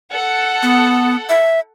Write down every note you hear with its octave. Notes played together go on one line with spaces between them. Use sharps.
A4 F#5
B3
E5